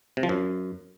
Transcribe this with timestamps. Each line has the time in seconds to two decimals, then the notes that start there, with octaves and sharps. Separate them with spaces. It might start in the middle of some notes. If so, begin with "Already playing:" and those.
0.17 C3
0.23 F3
0.29 F#2